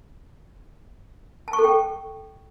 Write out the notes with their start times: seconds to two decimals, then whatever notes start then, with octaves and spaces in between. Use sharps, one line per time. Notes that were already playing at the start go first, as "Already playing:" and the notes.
1.48 A5
1.53 C#6
1.59 A4
1.64 G5